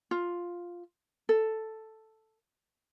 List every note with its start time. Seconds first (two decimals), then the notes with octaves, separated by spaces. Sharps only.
0.11 F4
1.29 A4